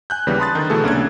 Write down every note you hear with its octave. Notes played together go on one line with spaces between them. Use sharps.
G#5 F#6 G6
D#2 C#3 E3 G3 B3
A5 B5 C6 D#6 F#6 A6
D3 D#3 D#4
B2 D3 E3 A3 G#4 A4
C2 A#3 C#4 D4 G#6